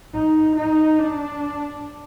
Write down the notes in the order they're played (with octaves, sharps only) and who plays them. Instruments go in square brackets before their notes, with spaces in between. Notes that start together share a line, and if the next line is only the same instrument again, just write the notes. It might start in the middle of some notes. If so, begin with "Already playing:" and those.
[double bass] D#4
D#4
D4